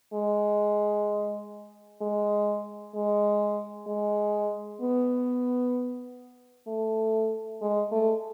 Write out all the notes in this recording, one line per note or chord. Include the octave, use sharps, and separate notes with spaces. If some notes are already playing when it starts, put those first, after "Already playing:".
G#3
G#3
G#3
G#3
B3
A3
G#3
A3